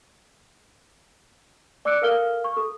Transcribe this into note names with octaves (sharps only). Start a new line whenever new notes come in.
D5 D6 E6 F#6 C#7 D7
A4 A#4 F5 F6 G7
C#6
A4